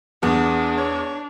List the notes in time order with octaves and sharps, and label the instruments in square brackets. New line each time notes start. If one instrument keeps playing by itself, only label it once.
[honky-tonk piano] E2 [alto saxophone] B3 [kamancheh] D4 [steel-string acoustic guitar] G#4
[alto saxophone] C#5